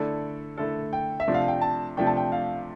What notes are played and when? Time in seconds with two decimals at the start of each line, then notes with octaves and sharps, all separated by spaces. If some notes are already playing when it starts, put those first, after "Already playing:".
Already playing: D3 A3 E4 A4 D5
0.58 D3 A3 E4 A4
0.93 G5
1.20 E5
1.27 C3 F3 A3 D4
1.34 F5
1.48 G5
1.61 A5
1.97 C3 F3 A3 D4 G5
2.07 A5
2.17 G5
2.32 F5